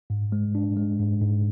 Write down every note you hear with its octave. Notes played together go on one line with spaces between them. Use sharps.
G#2
G#3
D4
G#3
G#2
G#2